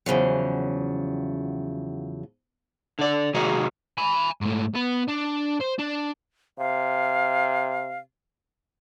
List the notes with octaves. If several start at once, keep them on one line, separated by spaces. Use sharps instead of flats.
E2 C#3 F3 F#3
D3 D5
C3 D#3 G#3 F#4 G#4 A#4
G#5 B5
G#2 A3
B3 B4
D4
C5
D4
C3 F5